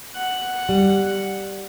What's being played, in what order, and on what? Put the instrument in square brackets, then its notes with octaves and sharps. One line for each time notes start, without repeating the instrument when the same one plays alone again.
[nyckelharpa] F#5
[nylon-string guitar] G3